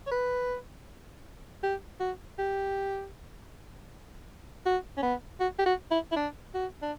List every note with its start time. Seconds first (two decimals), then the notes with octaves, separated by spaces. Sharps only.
0.07 C#5
0.11 B4
1.63 G4
2.00 F#4
2.38 G4
4.66 F#4
4.97 C#4
5.03 B3
5.40 F#4
5.59 G4
5.66 F#4
5.91 E4
6.12 E4
6.16 D4
6.54 F#4
6.82 D4